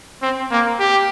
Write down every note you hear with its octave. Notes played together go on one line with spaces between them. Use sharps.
C4
A#3
G4